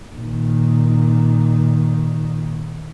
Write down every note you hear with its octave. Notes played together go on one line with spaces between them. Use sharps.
A#2 D#3